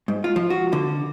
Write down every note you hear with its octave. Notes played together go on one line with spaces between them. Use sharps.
G#2
F4
F3
F#4
D3